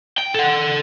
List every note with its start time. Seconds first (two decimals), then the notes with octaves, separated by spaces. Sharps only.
0.18 G5
0.35 A4 F#5